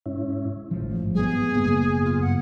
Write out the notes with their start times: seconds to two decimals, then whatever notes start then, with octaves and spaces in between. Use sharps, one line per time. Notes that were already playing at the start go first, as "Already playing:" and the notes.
0.06 G#2 C#4 E4
0.71 A1 G#2 F3
1.15 G3 B3 G#4
1.54 F#1 A#3 B3
2.05 F4
2.20 G2 F#5